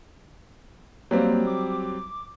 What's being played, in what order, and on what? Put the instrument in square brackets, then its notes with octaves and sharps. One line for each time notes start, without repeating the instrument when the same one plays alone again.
[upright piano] F#3 G3 C4 [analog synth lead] A#3
[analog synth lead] D6